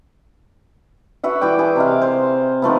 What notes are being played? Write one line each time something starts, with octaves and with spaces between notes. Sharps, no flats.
F#4 B4 E5 F#5
E3 D5 G5 D6
G#4 B4
C3 D#5 F5
C5
D#3 F3 A3 B3